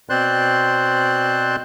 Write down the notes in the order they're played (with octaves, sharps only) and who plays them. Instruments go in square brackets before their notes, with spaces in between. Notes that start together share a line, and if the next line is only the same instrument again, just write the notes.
[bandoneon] B2 C4 C5 D5 C6 F#6